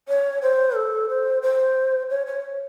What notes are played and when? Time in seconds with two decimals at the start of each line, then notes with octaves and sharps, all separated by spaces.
0.08 C#5
0.42 C5
0.76 A4
1.09 C5
1.42 C5
2.10 C#5
2.27 C#5